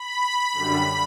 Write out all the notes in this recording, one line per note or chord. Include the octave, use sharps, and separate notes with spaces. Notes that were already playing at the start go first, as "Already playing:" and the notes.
Already playing: B5
F#2 D3 G3